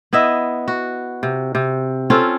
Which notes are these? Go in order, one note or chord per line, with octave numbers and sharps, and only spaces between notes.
B3 E4 D#5 E5
F#4
C3
C3
C4 C#4 F4 A4